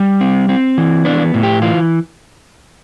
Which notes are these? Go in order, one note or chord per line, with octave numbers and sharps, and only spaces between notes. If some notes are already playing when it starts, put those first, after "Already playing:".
Already playing: G3
C4
C4
E3
B3 D4
A2
G4
E3 F4